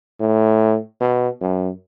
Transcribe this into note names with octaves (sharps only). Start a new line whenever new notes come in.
A2
B2
F#2